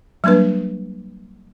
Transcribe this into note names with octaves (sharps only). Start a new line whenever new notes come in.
F#3 G3 A#3 D4 B4